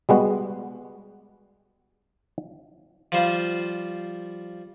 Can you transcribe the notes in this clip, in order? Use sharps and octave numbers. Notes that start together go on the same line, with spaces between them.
G3 G#3 B3 F#4
F3 G3 C5 F5